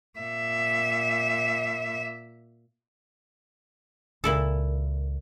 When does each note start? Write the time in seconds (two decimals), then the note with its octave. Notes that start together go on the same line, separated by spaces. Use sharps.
0.19 A#2 E5
4.24 C#2 A#2 E4 A4